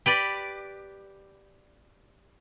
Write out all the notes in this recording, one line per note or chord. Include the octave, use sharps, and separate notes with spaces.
G4 B4 D5